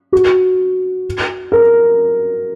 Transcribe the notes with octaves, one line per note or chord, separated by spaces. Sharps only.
F#4
A#4